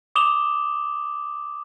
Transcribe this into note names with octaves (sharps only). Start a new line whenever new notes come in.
D6 D#6 E7 F7 G7